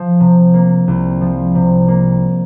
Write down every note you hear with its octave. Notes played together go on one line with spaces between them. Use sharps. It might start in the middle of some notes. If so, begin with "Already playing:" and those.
Already playing: F3
C3
A#3
C2
F3
C3
A#3